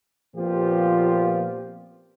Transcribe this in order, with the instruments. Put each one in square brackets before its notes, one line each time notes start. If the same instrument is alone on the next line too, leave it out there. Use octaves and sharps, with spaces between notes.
[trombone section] A#2 F3 B3 C4 F4 G4